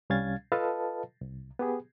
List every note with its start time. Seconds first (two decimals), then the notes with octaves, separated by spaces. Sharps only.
0.10 C2 G3 C#4 F5 G#6 A6
0.52 F4 A4 B4 D#5 F5 A5
1.21 C2
1.59 B3 G4 G#4